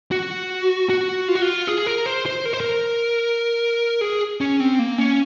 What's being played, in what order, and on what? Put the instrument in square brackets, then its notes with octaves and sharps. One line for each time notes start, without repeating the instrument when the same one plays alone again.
[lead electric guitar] F#4
F#4
F4
F#4
F4
G#4
A#4
C5
C5
A#4
C5
A#4
G#4
C#4
C4
A#3
C#4